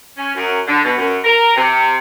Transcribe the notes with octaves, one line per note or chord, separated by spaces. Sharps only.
C#4
F#2
D3
B2
F#2
A#4
C3